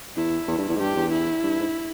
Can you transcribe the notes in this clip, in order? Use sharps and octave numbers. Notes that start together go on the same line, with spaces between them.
E2 E4
E2
G2
E2
G#2
G2 G4
E2
E4
G2
G#2